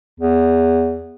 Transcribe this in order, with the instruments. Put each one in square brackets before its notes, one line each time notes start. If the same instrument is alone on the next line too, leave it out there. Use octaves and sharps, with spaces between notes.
[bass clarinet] E2